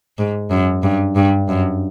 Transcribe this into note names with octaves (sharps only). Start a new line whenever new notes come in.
G#2
F#2
G2
G2
F#2